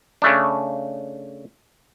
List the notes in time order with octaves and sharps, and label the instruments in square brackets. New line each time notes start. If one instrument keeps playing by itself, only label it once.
[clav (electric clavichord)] C#3 A3 D4